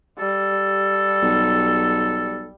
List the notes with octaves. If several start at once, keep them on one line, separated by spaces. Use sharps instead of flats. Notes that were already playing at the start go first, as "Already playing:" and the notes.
G3 A4
B1